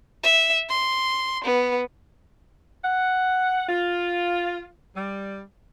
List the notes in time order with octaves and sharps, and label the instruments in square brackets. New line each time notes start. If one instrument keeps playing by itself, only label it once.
[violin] E5
C6
B3
[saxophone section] F#5
F4
G3